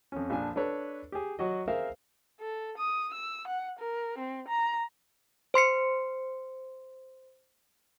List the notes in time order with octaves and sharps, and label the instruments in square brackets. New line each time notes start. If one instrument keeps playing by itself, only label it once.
[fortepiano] F2 C#4
A#1 F3 D4 G#5
D4 A4 B4 C#5
G4 G#4
F#3 F#4 D#5
G#4 A#4 C5 E5 F5
[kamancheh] A4
D#6
E6
F#5
A#4
C4
A#5
[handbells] C5 C6 C7 C#7